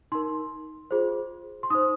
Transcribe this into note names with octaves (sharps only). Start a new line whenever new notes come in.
D#4 A#4 C6
F4 G#4 C5
C6
D#4 C5 D#6